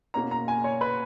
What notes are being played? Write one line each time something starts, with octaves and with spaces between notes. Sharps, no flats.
B2 A#3 C#4 A#5
A#5
G#5
C#5
B4